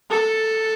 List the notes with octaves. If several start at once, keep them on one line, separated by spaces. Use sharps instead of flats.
A4